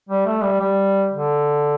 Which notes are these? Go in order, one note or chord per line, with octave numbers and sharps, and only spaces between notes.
G3
A3
G3
G3
D3